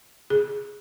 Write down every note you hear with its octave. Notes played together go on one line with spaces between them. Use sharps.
G#4